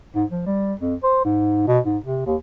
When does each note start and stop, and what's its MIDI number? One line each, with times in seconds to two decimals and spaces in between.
0.15 0.25 44
0.30 0.46 53
0.46 0.74 55
0.80 0.95 41
1.04 1.22 72
1.25 1.67 44
1.68 1.80 47
1.85 1.98 44
2.04 2.26 48
2.27 2.37 39